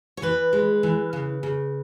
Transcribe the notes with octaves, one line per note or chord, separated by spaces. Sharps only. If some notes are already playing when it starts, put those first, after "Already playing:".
C#5
E3 B4
G#3
E3
C#3
C#3